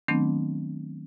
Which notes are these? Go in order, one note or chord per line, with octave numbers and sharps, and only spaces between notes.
D#3 F#3 A3 B3 C4 D4